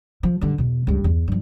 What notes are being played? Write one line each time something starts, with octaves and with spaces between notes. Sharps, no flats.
F3
G2 D3
E2 B2
C#2 G2
E2
G2 F3